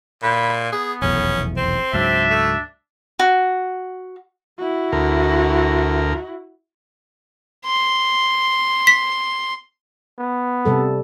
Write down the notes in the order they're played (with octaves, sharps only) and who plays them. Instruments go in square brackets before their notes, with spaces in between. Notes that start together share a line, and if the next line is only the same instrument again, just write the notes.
[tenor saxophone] A#2 [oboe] B5
[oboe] B3 [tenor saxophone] G#4
[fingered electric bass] F1 B1 E2 [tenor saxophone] C#4
[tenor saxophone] C4 [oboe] C5
[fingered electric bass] C#2 G#2 F#3 [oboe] D4 [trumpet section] E5
[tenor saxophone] A3
[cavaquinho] F#4
[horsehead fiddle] E4 F#4
[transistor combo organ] D2 A#4
[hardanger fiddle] C6
[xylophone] B6
[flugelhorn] B3
[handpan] C3 G3 A4